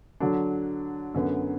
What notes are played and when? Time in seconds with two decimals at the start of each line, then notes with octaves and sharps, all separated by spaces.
0.20 D3 F#3 D4
1.14 F#2 D3 B3